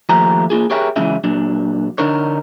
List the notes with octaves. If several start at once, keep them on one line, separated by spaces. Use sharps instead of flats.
D#2 F3 A3 G4 C5 A#5
A#3 C4 F4 G#4
G4 G#4 A#4 C#5 E5 G5
C#3 E3 F#3 G#3 C#4 E5
A#2 F#3 D4
D3 D4 D#4 A#4 C#5